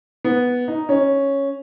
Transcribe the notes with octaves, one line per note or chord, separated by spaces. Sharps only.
B3
D#4
C#4